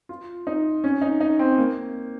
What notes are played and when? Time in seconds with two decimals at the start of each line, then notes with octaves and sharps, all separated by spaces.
0.09 F4
0.47 D#4
0.84 C#4
1.02 D#4
1.21 D#4
1.39 C4
1.58 A#3